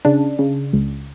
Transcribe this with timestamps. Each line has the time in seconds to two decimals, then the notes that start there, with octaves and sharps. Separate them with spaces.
0.05 C#3 D4
0.39 C#3
0.73 C#2